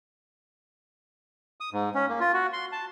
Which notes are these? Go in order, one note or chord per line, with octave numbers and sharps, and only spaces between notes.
D#6
G#2
C#4
A#3
F4
F#4
C6
A5